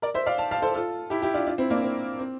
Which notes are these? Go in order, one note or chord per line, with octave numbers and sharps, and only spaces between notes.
A#4 D5
C5 E5
D5 F5
F5 A5
F5 A5
A4 C5
F4 A4
E4 G4
E4 G4
D4 F4
D4 F4
C4 E4
A#3 D4
C4
C4